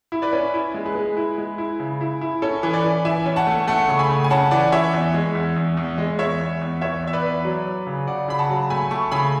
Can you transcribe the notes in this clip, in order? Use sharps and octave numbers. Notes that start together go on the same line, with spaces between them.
E4
B4 D5
C#4
E4
G#3
G#4 B4
G#3
E4
G#3
E4
C#3
E4
E4
C#4 A4
E3
B4 D5
E3
E3 E5 G#5
C#4
F#5 A5
A3
A3 F#5 A5
C#3 C#6
G#5 B5
C#3
G#5
C#4 F#5 A5
E3 D5 F#5
E3 C#5 E5
E2
G#3
E2
E2
E2
G#3
E2 C#5 E5
E2
E2
E2 C#5 E5
E2
E5
B4 D5
E2
F#3
F#3
C#3
C#3 D5 F#5
C#3 B5
F#5 A5
F#3
A3 G#5 B5
A3 A5 C#6
C#3 G#5 B5